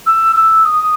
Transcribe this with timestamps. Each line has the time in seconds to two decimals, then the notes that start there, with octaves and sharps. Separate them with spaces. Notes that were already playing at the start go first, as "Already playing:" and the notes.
0.06 E6
0.36 E6
0.65 D#6